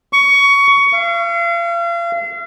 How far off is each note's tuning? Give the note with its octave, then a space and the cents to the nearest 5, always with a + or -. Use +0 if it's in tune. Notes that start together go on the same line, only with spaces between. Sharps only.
C#6 +20
F5 -40